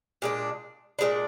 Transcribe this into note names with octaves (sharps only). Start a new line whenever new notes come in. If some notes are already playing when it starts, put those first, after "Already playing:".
A#2 G#3 D4
A#2 G#3 D4